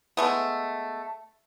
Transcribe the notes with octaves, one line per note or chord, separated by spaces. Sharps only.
G#3 A3 B3